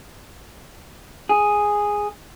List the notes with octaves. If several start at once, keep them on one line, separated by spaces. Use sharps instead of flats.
G#4